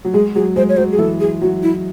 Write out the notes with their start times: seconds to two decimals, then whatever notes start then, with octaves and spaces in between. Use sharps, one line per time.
0.05 F#3
0.14 G#3 G#4
0.35 F#3 G#4
0.56 G#3 C5
0.69 C#5
0.77 F#3 C5
0.92 G#4
0.98 E3 A4
1.20 G#4
1.41 F#3 F#4
1.63 E4